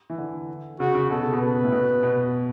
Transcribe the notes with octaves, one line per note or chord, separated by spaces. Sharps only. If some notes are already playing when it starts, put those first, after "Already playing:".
E3
D3
C#3 F#4
C#3
B2 A4
C#3
B2
B4
A2
B2
B2